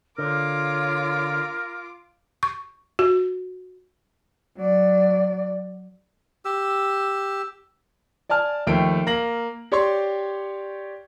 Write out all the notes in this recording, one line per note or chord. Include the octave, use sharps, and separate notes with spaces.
D3 F4 A#4 C#5 D6
C#6
F#4
F#3 D5
G4 E6
D5 G#5 A5 F6
D#2 F3 A3 G5 D7
A#3 A#6 F#7
G4 C#5 D5 G5 C6 C#6